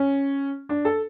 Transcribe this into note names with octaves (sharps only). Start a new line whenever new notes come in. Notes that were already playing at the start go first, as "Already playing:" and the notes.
Already playing: C#4
D4
A4